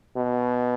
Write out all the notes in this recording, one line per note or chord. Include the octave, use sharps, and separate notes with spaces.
B2